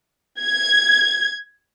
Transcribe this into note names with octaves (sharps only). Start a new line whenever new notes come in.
G#6